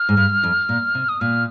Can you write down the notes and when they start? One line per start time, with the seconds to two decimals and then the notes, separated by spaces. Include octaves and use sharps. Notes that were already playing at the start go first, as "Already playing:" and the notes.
Already playing: F6
0.09 G#2
0.17 G2
0.43 F2
0.69 A#2
0.95 C3
1.09 D#6
1.20 A#2 F6